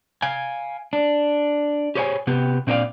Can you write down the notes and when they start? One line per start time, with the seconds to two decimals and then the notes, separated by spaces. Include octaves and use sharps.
0.22 F5 G#5
0.93 D4
1.95 G4 G#4 C5 C#5 D#5 G#5
2.27 C3 B3 G4
2.67 A#2 C4 D4 A#4 D5 F5